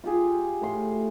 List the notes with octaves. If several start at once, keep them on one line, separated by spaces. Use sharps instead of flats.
F4 G4 G#4
A2 C6